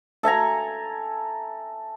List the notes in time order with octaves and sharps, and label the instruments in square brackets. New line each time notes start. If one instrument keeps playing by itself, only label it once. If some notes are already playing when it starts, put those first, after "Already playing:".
[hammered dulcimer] A4 E5 G#5 A#5